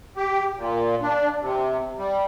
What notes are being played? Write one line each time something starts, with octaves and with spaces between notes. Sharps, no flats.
G4
A#2
D4
C3
G3